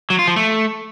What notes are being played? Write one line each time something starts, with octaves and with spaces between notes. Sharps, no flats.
F#3
F4
F3
A3